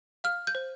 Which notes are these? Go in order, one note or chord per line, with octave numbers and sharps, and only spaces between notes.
F5 F6
G6
C5